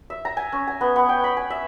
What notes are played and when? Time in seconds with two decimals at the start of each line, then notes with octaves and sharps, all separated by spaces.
0.10 E5
0.25 A#5
0.37 G#5
0.52 C#4
0.68 G#5
0.81 B3
0.96 B3
1.09 G5
1.24 B5
1.37 G#5
1.50 E5